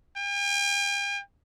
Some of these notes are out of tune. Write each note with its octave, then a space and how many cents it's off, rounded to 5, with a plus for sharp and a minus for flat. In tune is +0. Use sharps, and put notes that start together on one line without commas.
G5 +45